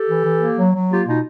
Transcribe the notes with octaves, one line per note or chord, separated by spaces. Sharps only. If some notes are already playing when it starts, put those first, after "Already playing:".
Already playing: G4 A4
E3
E3
A#3
F#3
F#3
A#3 F4 G4
B2 D#4 F4